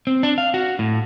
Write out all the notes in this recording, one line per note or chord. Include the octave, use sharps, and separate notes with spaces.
C4
D4
F5
F#4
A2